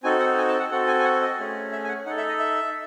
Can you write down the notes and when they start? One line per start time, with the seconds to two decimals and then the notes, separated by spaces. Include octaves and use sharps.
0.03 C4 D#4 F#4 A4 G#5
0.20 F#5
0.38 G#5
0.48 A5
0.60 F#5
0.71 C4 F#4 A4 F#5
0.87 G#5
0.99 G#5
1.04 F#5
1.21 D#5
1.39 A3 C#4 G#4
1.72 E5
1.84 G#5
1.88 F#5
2.06 D#4 F#5
2.10 A4
2.17 E5
2.28 D#5
2.39 E5